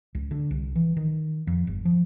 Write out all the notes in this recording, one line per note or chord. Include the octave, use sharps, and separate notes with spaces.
C#2
D3
C2
E3
D#3
F2
G1
F3